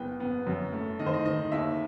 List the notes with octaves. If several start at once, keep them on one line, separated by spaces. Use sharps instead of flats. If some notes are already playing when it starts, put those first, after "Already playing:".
Already playing: F#1 B3 G5
B3
F#2
A3
D#3 D#5
C5
D#5
D#3 D#5
D#2 E5